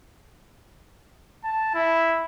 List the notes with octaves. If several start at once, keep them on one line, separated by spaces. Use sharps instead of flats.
A5
E4